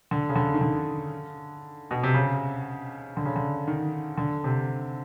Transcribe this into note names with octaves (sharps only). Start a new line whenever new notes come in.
D3
C#3
D3
D#3
D3
B2
C3
C#3
D3
C#3
D3
D#3
D3
C3